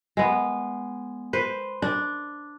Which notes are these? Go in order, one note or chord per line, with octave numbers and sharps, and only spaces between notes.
G#3 B3
B4 C5
D4